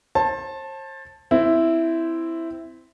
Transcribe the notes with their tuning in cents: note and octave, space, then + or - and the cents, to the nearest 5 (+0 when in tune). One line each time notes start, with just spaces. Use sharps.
C5 +40 A5 +0
C4 -10 E4 +0